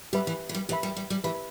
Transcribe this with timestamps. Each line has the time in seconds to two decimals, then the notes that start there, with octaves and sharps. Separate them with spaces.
0.13 G3 G4 B4 E5 B5
0.27 E3
0.49 E3
0.55 G3
0.69 E3 G4 B4 E5 B5
0.83 G3
0.97 G3
1.10 G3
1.24 E3 G4 B4 E5 B5